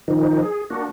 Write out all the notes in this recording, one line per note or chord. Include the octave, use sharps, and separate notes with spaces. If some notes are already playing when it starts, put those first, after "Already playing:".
D#3 F3 D#4
G#4
A#3 D4 F#4